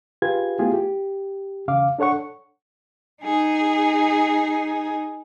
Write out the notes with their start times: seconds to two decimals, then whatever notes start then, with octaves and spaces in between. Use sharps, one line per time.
0.22 F4 G4 G#4 B4 G#6
0.59 A3 B3 E4 F4 G4 G#4
0.74 G4
1.68 E2 C#3 F5 D6
1.99 D4 A4 C#5 F#5 C#6
3.23 D#4 G#4